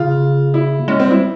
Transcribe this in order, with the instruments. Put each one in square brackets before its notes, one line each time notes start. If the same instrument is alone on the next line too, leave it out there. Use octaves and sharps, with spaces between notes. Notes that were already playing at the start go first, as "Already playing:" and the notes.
Already playing: [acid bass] C#3 [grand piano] F4
[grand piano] E4
[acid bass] A#3
[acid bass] G#3 [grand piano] C#4
[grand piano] C4
[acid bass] G3
[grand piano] E4